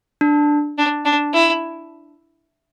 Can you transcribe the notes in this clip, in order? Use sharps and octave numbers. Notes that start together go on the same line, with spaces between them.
D4
D4
D4
E4